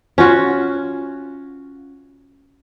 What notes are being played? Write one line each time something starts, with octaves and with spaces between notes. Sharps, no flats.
C#4 F4 F#4